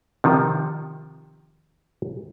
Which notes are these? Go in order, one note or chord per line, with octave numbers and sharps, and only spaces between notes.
C3 D#3 F3